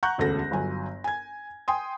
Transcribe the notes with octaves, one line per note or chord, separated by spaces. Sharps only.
F#5 A#5 C#6 F#6 G6
E1 D2 C#4 A4 A#6
G1 F#3 G#5
G#5 G#6
G5 G#5 C6 D#6